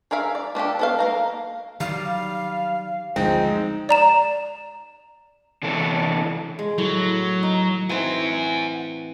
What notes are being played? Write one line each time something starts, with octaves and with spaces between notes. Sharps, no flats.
G#4 A#4 E5 F5
D5
A#3 D4 G4 A4
B3 A4 F5
A#3 F5 A#5
D#3 F#3 G3 F5
F#1 D2 F3 G#3 C4 D#4
D5 A#5 E7
C3 E3 A4 C#5
G#3
A2 F#3
D#4
E3 C4 F#5 G#5